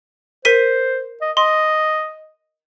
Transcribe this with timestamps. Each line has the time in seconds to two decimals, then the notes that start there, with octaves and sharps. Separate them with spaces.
0.45 A#4 C5 B6 D#7
1.21 D#5
1.37 D#5 C6